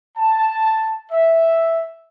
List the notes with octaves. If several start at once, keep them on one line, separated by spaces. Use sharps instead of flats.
A5
E5